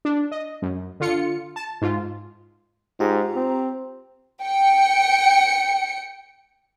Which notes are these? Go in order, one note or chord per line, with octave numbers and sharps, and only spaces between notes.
D4
D#5
F#2
D3 F4 C#7
A5
G#2 F4
G#2 F4 G4 A#5
C4
G5 C#7